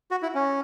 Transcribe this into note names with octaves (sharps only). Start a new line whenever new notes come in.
F#4
E4
C#4